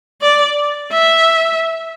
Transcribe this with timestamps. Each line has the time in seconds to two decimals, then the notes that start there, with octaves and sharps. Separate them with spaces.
0.22 D5
0.92 E5